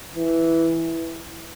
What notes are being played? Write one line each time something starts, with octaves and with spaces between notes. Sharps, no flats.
E3